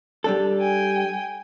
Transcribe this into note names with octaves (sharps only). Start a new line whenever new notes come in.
G3 D4 A4
G5 G#5